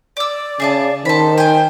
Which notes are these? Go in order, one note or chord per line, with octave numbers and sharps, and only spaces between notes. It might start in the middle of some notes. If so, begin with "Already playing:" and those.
D5 D6 E6
C#3 G#4 E5 A5
D#3 A4 C5 B5
C5 G5 G#5